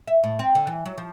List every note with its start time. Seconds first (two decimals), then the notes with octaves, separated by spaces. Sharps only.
0.07 E5
0.24 A2
0.39 C4
0.55 D3
0.67 E3
0.86 F#3
0.98 F3